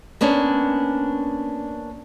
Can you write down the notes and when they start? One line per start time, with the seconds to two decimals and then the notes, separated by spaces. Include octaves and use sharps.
0.21 A#3 B3 C#4 D4